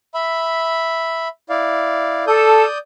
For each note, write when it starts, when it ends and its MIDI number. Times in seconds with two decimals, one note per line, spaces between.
0.14 1.28 76
0.14 1.28 83
1.49 2.25 64
1.49 2.25 74
1.49 2.25 77
2.27 2.64 69
2.27 2.78 74
2.27 2.78 87
2.27 2.78 91